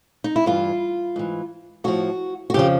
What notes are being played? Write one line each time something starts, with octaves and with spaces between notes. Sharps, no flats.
D#4
E4
G2 E3 F4
G#2 E3
A2 F3 F#4
F#4
F2 C#3 F3 G4